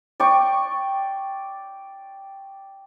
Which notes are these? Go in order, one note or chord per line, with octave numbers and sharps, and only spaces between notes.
D5 G5 C#6